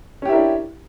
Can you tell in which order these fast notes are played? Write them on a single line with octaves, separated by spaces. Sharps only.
C#4 G4 E4 A#4 D4